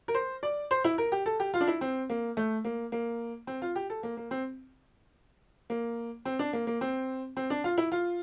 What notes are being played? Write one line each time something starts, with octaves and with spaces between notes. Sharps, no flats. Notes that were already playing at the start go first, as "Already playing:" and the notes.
A#4
C5
D5
C5
E4
A#4
G4
A4
G4
F4
D4
E4
C4
A#3
A3
A#3
A#3
C4
F4
G4
A4
A#3
A#3
C4
A#3
C4
D4
A#3
A#3
C4
C4
D4
F4
E4
F4